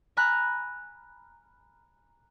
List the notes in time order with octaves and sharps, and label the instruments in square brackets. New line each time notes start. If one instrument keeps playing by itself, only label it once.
[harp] G#5 A#5 B5 F6 F#6 A#6